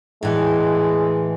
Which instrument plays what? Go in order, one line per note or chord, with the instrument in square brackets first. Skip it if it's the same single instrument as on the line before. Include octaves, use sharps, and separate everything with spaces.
[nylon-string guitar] A2 E3 [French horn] G#3